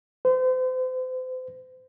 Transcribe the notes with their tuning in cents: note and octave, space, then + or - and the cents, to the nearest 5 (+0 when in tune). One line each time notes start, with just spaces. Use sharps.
C5 -35